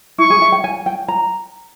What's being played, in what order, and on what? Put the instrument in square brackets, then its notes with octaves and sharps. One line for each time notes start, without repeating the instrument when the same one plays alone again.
[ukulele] E4 [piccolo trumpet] C#6
[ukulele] G#4
E5
G5
G#5
G5
A#5